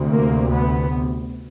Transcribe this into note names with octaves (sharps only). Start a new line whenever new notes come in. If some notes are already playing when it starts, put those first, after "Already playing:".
Already playing: D2 C3
A#3
B3